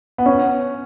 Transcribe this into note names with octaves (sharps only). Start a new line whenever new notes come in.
B3
C#4